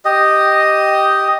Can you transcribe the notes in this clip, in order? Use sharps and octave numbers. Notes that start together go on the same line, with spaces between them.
G4 D#5